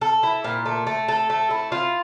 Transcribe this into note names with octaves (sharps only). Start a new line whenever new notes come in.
A4
E4
A#2
A3
A3
A4
A3
E4
F4